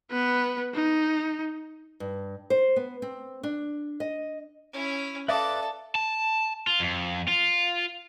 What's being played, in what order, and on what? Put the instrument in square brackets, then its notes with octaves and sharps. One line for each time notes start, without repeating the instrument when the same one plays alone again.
[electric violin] B3 B4
D#4
[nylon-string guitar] G2
C5
B3
C4
D4
D#5
[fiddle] C#4 E4
[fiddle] A4 A5 [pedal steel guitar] B4 D5 D6 [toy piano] E5 F5 D#6
[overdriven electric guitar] A5
F4
F2
F4